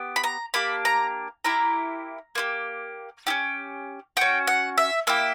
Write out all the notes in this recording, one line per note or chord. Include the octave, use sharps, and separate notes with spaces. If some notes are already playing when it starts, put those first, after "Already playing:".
Already playing: B3 G4
B5
A#5
A#3 D4 G4 B5
A#5
A#3 E4 G4 A#5
A#3 E4 G4
C#4 E4 G4
C#4 F#4 G5
F#5
E5
A#3 E4 G4 E5